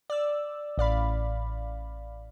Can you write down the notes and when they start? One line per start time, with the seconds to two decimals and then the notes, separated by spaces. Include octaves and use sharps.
0.10 D5 E6
0.78 A1 D5 F5 B5